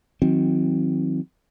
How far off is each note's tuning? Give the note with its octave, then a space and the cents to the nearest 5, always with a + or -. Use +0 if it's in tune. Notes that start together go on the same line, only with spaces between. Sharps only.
D#3 +25 F#3 -15 C4 +0